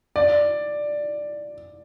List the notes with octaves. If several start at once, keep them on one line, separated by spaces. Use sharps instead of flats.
D5